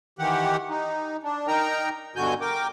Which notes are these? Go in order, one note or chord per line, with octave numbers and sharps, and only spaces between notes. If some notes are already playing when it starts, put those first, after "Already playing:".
D#3 E3 G4 F#5
D#4
D4
D#4 A#4 G5 A#5
G2 B2 D3 F#4 G#5 G6
A#4 G5 D6